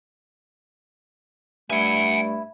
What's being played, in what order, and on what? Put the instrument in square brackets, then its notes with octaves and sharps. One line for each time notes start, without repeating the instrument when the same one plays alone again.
[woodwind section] G2 G3 A3 [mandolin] E4 [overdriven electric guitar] F#5 G#5